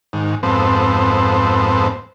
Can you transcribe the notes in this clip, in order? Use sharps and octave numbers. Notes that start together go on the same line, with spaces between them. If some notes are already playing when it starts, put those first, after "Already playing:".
G#2 D#3
F2 G#2 B3 C4 A4 C5